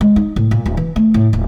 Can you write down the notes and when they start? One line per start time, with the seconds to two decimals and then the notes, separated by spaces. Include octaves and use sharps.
0.01 G#3
0.16 D#4
0.36 A2
0.51 A#2
0.66 D1
0.77 E3
0.96 A3
1.14 A2
1.33 D#1